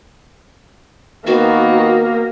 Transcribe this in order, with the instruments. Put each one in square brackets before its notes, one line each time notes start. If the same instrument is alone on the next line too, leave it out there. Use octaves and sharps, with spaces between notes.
[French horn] D#3 [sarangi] A#3 [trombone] B3 [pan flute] F#4